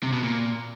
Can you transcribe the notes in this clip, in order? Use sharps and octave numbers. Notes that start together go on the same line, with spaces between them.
C3
B2
A#2